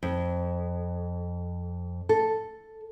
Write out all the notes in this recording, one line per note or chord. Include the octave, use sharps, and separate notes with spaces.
F2
A4